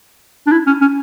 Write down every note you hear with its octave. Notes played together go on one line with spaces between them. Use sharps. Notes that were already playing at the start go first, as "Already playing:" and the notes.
D4
E4
C#4
C#4